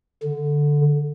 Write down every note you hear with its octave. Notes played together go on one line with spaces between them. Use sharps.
D3